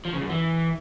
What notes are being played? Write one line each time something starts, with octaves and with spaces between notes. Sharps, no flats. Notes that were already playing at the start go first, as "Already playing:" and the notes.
F3
C#3
F#2
E3